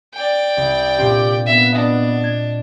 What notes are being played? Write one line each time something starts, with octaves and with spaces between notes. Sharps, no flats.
D5 G5
C2
A#2 C4 D4 G4
B3 E5
D4 D#5
G#6